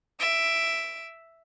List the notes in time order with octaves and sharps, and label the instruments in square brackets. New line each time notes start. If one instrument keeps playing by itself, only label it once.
[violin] E5 D7